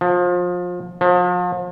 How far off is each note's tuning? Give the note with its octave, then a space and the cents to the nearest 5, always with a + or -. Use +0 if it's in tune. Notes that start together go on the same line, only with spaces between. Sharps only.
F3 +30
F3 +40